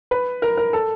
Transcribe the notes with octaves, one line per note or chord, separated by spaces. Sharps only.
B4
A#4
A#4
A4